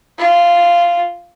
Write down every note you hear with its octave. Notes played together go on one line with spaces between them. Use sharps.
F4